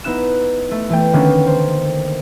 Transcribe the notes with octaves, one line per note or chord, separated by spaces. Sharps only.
B3 D#4 E4 F#6 E7
A3
E3 A3 G5
D3 D#3 A#3 B3 C#4 D4
C5